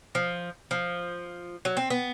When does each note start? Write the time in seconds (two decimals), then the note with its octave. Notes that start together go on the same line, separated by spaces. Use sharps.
0.15 F3
0.71 F3
1.65 F#3
1.77 C4
1.90 B3